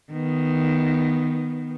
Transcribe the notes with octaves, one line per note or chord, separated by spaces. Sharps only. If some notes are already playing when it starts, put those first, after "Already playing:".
D#3 B3